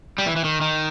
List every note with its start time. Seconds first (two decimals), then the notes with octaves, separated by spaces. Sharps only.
0.18 G3
0.26 E3
0.36 E3
0.44 D#3
0.61 D#3